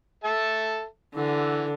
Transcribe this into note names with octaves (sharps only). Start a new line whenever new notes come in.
A4 E5 A5
D3 E3 F#5